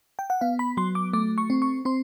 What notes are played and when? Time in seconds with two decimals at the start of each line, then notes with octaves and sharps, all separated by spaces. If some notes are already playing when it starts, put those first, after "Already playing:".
0.19 G5
0.30 F#5
0.41 B3 F5
0.59 B5
0.77 F#3 C6
0.95 D6
1.13 A3 D6
1.38 C#6
1.50 C4
1.62 C#6
1.85 C4 C6